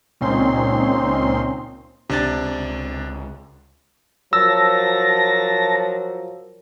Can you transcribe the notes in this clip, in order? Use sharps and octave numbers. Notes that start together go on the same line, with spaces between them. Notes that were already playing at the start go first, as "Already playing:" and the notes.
C#2 A#2 C4 C#4 D#4 C6
C#2 C3 D4 A6
F3 F#3 A#4 A5 E6 A#6